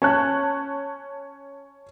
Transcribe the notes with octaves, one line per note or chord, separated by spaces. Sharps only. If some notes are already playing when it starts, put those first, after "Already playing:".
C#4 A5 F#6